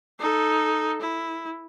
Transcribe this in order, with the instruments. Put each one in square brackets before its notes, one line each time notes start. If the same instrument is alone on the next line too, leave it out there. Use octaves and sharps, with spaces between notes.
[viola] D#4 A4
E4